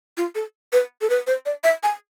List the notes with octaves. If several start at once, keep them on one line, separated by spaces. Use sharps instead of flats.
F4
A4
B4
A4
B4
C5
D5
E5
G#5